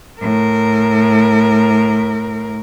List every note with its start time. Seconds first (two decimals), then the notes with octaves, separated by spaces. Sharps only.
0.21 A2 A#4